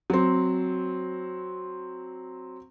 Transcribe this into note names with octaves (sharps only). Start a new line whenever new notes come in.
F#3 C4